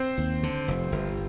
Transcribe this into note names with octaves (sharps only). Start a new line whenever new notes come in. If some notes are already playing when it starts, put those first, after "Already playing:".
Already playing: C4 C5
D#2
D3
F1
G1